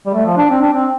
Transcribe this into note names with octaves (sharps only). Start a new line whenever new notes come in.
G3
A3
F3
D4
C4
D4
C4